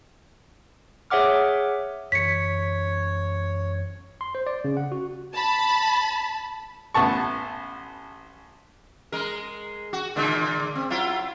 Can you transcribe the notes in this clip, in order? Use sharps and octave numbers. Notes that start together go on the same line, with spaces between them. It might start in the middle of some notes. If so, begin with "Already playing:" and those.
G#4 C#5 E5 F#5 D6 F6
F#2 E3 C#5 B6 C#7
C6
C5
D5
C#3
F#5
F#4
A5 B5
A1 B3 A5 C#6
G#3 A#4
F#4
A#2 D3 G#3
C4
F#3 E4 F4